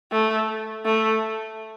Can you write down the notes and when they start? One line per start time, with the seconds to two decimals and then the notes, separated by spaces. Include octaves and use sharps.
0.12 A3
0.85 A3